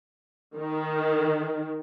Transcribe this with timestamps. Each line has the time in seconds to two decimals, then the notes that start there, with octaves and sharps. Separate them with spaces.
0.57 D#3